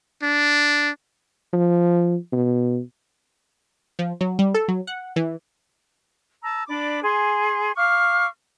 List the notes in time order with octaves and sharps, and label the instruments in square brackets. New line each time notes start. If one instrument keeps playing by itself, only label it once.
[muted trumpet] D4
[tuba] F3
B2
[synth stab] F3
F#3
G3
A4
F#3
F#5
E3
[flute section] A5 A#5 E6
D4 D5 B5 D6
G#4 G#5 C6
F5 C#6 D6 F6